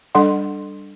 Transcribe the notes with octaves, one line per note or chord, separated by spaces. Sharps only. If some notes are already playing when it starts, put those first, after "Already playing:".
G3 D4 A4 F#5 C6